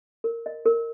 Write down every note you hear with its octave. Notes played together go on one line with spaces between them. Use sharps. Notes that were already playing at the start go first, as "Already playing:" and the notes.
A#4
D#5
A#4